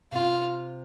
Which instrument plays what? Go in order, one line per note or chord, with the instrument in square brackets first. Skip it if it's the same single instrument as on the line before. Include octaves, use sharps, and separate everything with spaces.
[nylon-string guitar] C3 [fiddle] F4